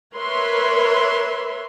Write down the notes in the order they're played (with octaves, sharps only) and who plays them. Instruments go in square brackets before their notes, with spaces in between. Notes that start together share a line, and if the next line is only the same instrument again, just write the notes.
[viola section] A#4 B4 C#5 E5 C6